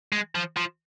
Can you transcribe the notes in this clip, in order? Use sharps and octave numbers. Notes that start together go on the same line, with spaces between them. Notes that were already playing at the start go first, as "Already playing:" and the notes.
G#3
F3
F3